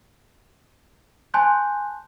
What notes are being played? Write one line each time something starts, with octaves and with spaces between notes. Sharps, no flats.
G#5 A5 C6 F#6 G6